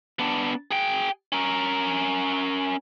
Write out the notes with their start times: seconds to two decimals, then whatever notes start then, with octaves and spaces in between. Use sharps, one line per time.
0.19 B3 D4
0.71 G#4 G5
1.32 C#4 A#4